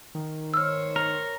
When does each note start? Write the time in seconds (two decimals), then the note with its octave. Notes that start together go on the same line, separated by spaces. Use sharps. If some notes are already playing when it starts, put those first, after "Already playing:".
0.15 D#3
0.54 C5 C#5 E6 F6
0.96 A#4